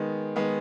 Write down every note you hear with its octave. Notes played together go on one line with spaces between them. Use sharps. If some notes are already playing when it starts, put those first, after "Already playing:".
Already playing: D#3 G#3 B3
D#3 G#3 B3